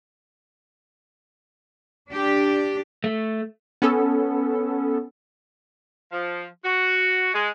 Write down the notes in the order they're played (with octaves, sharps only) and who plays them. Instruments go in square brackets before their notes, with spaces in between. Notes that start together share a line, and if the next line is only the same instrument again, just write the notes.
[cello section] D4 G4
[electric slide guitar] A3
[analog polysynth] B3 C#4 A4
[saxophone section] F3
F#4
G#3